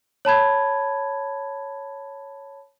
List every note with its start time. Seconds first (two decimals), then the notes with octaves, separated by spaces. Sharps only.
0.25 C#5 A5 B5 G#6